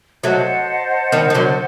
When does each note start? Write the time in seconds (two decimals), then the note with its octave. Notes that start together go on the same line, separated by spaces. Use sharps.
0.23 F#3 A3 C5 D#5 F#5 A5
1.12 D#3 G3
1.30 D#3
1.34 D3 F#3